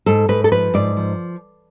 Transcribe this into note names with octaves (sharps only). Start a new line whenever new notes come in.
G#2 A4
G#2 B4
A4
F3 B4
G#2 D5
F3